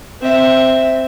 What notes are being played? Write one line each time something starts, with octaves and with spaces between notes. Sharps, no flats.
C4 E5